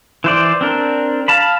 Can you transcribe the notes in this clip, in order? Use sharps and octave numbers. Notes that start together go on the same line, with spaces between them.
E3 C5 D5
C4 D4 A#4
F5 A5 B5